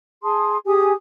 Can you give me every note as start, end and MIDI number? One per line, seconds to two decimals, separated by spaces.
0.22 0.56 68
0.22 0.56 81
0.22 0.56 84
0.22 0.56 87
0.66 0.92 67
0.66 0.92 68
0.66 0.92 80
0.66 0.92 87